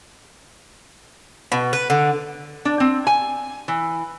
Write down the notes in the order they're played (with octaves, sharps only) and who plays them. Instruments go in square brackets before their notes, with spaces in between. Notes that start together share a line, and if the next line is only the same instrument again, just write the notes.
[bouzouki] B2
B4
D3
[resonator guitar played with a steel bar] D4
C4
G#5
E3